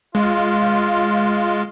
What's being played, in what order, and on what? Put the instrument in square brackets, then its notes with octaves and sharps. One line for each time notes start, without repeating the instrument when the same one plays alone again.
[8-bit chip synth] G#3 [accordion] F4